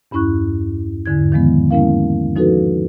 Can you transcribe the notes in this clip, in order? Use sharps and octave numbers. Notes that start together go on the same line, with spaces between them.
E2 G2 C#4 E4 C#6 F#6
E2 G#2 D3 E4 G#6
D#3 F3 G#3 B3
G#3 A#3 C#4 E4 A#4 F5
F3 D#4 F#4 A4 B4